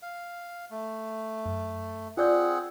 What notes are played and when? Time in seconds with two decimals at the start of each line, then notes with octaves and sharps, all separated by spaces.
0.02 F5
0.71 A3
1.46 F#2
2.17 C4 F4 G#4 D5 F#5 G6